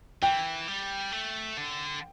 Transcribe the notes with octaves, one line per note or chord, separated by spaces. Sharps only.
E3 G5
G3
A3
D3